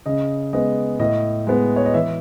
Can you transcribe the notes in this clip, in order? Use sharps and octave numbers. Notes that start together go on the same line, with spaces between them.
C#3 D#5
G#3 B3 D#5
A2 D#5
G#3 B3
C#5
D#5
E3 E5